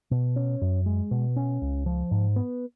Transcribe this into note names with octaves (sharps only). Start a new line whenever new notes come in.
B2
C#4
F#2
G#3
B2
C#4
C#2
F3
G#2
B3